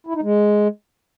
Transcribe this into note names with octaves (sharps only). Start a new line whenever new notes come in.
E4
D#4
G#3